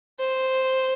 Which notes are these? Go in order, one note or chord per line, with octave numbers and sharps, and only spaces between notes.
C5